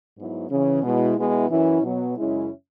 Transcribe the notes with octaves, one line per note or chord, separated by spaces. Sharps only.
G#2 F#3 B3 E4
C#3 E3 C#4
B2 G#3 E4
B2 G#3 B3 E4
F#2 E3 C#4 E4
B2 F#3 B3
F#2 C#3 G#3 C#4 E4